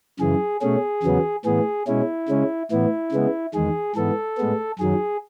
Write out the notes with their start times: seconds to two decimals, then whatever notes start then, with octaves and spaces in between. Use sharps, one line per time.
0.20 F#2 C#3 E3 G#4
0.61 B2 A3 C#4 G#4
1.03 E2 C#3 F#3 B3
1.45 A2 E3 B3 G#4
1.87 B2 G#3 C#4 E4
2.29 C#3 G#3 C#4
2.71 A2 E3 B3 E4
3.12 C#3 G#3 B3
3.54 E2 D#3 G#3 G#4
3.96 G#2 E3 B3 A4
4.37 A2 G#3 B3
4.79 F#2 D#3 F#3 G#4